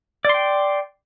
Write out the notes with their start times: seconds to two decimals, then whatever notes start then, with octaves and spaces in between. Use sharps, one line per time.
0.25 D5
0.29 C6
0.34 G5